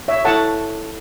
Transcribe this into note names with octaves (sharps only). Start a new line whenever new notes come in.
C#5 E5
E4 A4 C#5 F#5 A5